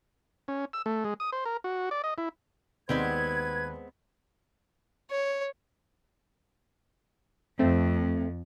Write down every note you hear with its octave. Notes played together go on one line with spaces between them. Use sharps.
C#4
E6
A3
G#3
D#6
C5
A#4
F#4
D5
D#5
E4
D#2 G#3 B3 C4 B4 D5 F#5 G#6
C#5
F2 A3 C4